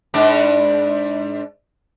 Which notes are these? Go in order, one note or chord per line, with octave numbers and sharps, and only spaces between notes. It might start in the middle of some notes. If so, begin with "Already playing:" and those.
G#2 D4